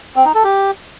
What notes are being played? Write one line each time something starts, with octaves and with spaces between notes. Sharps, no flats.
C4
D#4
A4
G4